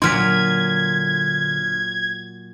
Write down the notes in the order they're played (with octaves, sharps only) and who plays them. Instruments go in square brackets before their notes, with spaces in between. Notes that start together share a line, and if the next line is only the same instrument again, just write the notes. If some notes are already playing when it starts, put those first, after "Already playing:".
[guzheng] A#2 F#3 [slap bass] D3 D4 [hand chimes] C6 F6 B6 [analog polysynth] G#6